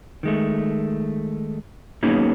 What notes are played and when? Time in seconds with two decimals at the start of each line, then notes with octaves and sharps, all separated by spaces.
0.23 D#3 G#3 A3
2.03 F#3 A#3 B3 C#4 D#4 G#4